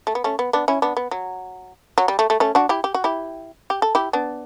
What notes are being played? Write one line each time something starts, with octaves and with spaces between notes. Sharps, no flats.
A3
B3
A3 C#4
B3
B3 D4
C#4 E4
B3 D4
B3
F#3
F#3
G3
A3
A3
A3 C#4
D4 F#4
E4 G4
G4
F#4
E4 G4
G4
A4
E4 G4
B3 D4